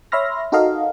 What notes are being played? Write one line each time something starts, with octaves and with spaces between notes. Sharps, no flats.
C#5 E5 B5 C6 F6 A#6
D#4 F#4 A4 A#4 D#5 F5